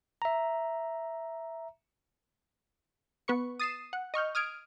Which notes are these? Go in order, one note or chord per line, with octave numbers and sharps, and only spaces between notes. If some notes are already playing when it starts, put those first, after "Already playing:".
E5 A#5
B3 B4 C#6 C#7
D#6 A6 C7 D#7 E7
F#5
D#5 C#6 F6 G6
D#6 F6 G#6 D7